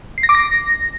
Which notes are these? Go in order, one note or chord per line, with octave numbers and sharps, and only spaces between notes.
C7
A#6
D6
A#6